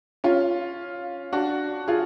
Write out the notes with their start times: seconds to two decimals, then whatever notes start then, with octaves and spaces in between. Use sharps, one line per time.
0.24 C#4 F4
1.33 D4 F#4
1.88 F4 G#4